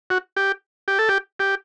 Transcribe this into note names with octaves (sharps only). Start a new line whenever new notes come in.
F#4
G4
G4
A4
G4
G4